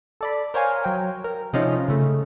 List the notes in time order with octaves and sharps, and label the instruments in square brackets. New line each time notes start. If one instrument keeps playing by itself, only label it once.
[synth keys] A4 D5 B5
A#4 C5 C#5 F5 G#5
F#3 G5
A#4
C3 F3 G#3 C#4 D#4 F4
C#3 A3